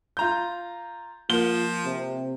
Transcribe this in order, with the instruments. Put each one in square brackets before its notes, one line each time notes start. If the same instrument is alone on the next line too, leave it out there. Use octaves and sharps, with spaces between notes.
[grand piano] F4 A#5 G6
[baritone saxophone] F3 [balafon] A#3 A#4 [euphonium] F4 [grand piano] G7
[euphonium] C3